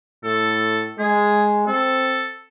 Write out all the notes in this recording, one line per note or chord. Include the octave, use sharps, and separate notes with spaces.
A2 A4
G#3 G#4
C4 A4